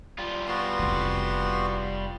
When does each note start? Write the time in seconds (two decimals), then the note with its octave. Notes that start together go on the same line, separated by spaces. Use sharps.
0.18 G3 F4
0.48 B3 F#4 C6
0.79 F1 E3